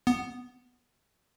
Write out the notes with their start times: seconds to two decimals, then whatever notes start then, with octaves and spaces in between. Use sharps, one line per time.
0.07 B3